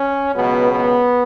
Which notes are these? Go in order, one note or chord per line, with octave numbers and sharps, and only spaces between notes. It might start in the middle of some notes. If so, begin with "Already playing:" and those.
Already playing: C#4
C#2 B2 F#3 B3
B3